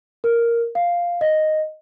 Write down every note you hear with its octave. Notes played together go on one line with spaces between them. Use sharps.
A#4
F5
D#5